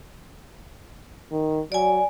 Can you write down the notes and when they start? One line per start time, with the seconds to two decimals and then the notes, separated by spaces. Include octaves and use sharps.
1.32 D#3
1.72 F#3 D5 G#5